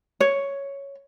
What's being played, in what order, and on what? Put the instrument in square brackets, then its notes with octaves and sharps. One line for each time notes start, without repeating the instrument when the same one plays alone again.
[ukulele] C#5